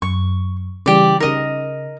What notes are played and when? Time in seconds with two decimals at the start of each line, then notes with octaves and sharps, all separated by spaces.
0.02 F#2 C#6
0.86 C#3 E3 G3 G4 D5
1.20 C#3 D#4 A#4 D#5